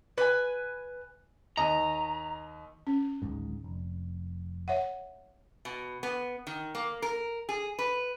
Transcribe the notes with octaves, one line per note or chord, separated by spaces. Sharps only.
B4 G#5
D#2 D#5 A#5
C#4
D1 G#1 G#2
F1
C#5 E5 F#5
B2
B3
D#3
A#3
A#4
G#4
B4